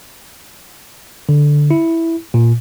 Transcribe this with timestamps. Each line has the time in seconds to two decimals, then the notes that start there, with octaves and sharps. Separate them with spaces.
1.29 D3
1.71 E4
2.34 A#2